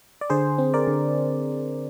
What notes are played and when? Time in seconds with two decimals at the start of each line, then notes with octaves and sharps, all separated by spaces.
0.21 D5
0.30 D3 G#4 C5
0.58 C4
0.74 A#4 D5
0.87 D3